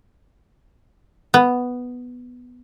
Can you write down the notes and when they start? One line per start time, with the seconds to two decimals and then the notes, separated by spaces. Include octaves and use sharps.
1.34 B3